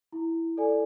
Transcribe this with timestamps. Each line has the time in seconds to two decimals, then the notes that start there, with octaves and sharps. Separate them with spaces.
0.12 E4
0.57 A4 D5 G#5